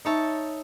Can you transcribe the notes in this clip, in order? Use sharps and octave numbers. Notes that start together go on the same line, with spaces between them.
D#4 C#5 E5 A5